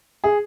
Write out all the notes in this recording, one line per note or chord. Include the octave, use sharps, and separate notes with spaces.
G#4